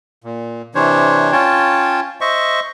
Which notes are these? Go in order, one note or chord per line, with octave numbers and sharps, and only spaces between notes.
A#2
C3 E3 D4 C5 C#5
C#4 F4 C#5 G5 A5
C5 D#5 E5 C#6